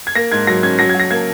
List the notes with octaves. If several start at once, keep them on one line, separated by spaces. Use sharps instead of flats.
G#6
A#3 A#6
G#2 G#6
F#3 A#6
C#4 G#6
F#3 A#6
G#6
F#3
A#6
A#3 G#6